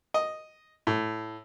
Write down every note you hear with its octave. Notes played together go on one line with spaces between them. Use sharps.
D#5
A2